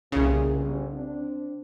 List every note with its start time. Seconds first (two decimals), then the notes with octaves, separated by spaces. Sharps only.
0.12 G1 C2 A#2 C#3 G#4
0.55 G1
0.92 C4 D4